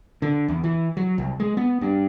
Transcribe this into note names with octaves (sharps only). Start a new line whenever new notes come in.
D3
E2
E3
F#3
C2
G#3
B3
G2